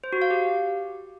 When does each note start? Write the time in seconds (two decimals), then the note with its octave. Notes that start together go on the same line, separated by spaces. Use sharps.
0.04 C5
0.13 F#4
0.22 F5
0.31 G4